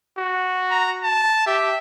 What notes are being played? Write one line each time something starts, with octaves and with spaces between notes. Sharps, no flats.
F#4
A#5
A5
G4 E5